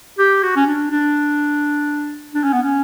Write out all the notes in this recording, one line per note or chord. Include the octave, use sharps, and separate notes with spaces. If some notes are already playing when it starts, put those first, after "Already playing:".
G4
F#4
C#4
D4
D4
D4
C#4
B3
C#4